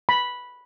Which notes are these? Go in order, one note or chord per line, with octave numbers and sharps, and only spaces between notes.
B5